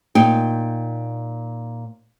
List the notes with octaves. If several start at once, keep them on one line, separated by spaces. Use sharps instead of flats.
A#2 D#4 G5